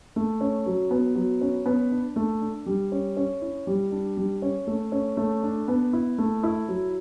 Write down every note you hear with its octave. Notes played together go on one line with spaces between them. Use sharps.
A3
C#4
F#3
B3
F#3
C#4
B3
D4
A3
D4
G3
C#4
C#4
E4
G3
D4
G3
C#4
A3
C#4
A3
D4
B3
E4
A3
E4
F#3